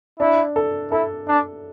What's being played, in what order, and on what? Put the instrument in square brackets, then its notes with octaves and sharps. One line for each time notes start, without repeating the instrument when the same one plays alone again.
[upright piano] D4 [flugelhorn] E4
[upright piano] A4
[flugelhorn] E4 [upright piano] A4
[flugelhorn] D4